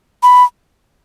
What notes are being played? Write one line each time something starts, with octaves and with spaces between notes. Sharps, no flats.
B5